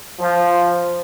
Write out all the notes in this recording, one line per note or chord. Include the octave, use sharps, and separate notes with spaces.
F3